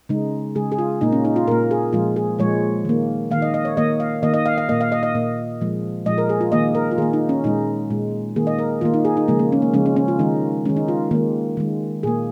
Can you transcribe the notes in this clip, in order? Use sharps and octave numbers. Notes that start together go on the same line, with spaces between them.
C#3 G#3 D#4
C#3 G#3 G#4
G#4
F4
A#2 A#3 D#4
C#4
D#4
F4
A#2 A#3 A#4
G#4
A#2 F3 G#3 F4
G#4
A#2 F3 G#3 C#5
D#3 A#3
D#3 A#3 F5
D#5
D#5
C#5
D#3 A#3 D#5
F5
D#3 A#3 D#5
D#5
F5
F5
A#2 A#3 D#5
F5
D#5
D#5
A#2 A#3
A#2 F3 G#3
A#2 F3 G#3 D#5
A#4
G#4
F4
D#3 A#3 D#5
A#4
F4
D#3 A#3 G#4
D#4
C#4
A#2 G#3 D#4
A#2 G#3
D#3 A#3 G#4
D#5
A#4
D#3 A#3 F4
D#4
G#4
D#4
C#3 F3 G#3 A#3
A#3
C#4
A#3
C#3 F3 G#3 C#4
C#4
C#4
F4
D#3 G#3 D#4
D#3 G#3 C#4
D#4
F4
D#3 G#3 A#3
D#3 G#3
A#2 A#3 G#4